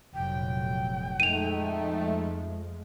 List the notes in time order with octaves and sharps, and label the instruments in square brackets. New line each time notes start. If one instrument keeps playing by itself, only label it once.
[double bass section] F1 A#2 F#3 [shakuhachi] G5
[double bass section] F2 F3 G#3 [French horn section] A3 D#4 [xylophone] D#7 F7